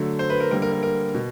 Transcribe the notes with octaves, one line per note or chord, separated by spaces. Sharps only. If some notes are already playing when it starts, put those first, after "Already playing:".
Already playing: D3 F#3 A3
C5
B4
A#4
D3 G3 A#3 A#4
A#4
A#4
A#4
B2